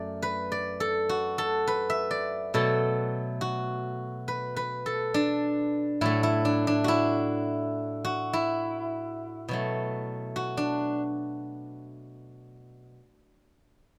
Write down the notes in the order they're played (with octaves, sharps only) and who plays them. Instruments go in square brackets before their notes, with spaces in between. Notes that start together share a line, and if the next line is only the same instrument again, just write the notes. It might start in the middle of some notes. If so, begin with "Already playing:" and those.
Already playing: [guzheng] F#2 A3 D5
B4
D5
A4
F#4
A4
B4
E5
D5
B2 F#3 A3 A4
F#4
B4
B4
A4
D4
A2 F#3 A3 E4
E4
D4
D4
E4 F#4
F#4
E4
B2 F#3 A3
F#4
D4